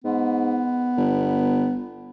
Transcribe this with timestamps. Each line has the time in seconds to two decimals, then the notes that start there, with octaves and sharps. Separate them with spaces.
0.04 G#2 B3
0.97 G1